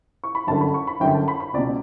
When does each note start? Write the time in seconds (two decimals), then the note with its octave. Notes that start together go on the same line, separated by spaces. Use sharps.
0.24 C#6
0.35 B5
0.47 G1 F#2 D3 A5
0.61 B5
0.74 C#6
0.87 B5
1.00 G1 F#2 D3 G5
1.14 A5
1.28 B5
1.40 B5
1.53 C#2 B2 D5